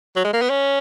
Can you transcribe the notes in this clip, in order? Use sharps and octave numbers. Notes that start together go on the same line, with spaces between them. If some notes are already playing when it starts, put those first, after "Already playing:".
F#3
G#3
A#3
B3
C#4